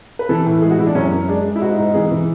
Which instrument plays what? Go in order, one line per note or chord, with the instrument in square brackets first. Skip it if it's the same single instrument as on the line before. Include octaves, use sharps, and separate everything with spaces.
[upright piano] B4
E3 A4
A2
G#3 G#4
F#4
E3 E4
D4
F#2 C#4
F#2
G#3 D4
G#3
E4
G#2 F#4
G#2
E3 G#4
E3